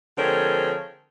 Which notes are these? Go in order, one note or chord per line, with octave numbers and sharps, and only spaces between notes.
D3 F3 G#3 C4 A#4 C#5